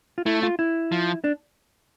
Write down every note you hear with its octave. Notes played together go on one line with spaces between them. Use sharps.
F4
A3 E4
F4
E4
F3
D4